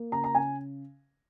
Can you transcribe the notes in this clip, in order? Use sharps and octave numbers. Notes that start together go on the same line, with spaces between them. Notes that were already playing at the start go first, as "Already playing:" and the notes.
Already playing: A#3
C#3 A#5
A#5
C#3 G#5